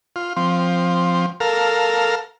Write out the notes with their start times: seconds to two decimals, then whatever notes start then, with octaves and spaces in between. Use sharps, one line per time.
0.16 F4
0.36 F3 C4
1.40 A4 A#4 F5